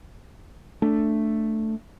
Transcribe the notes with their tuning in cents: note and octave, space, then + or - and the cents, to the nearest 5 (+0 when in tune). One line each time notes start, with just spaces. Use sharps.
A3 +5 D4 +0